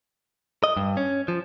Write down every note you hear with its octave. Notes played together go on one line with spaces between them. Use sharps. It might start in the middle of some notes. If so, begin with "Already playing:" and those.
D#5
G2
C#4
F3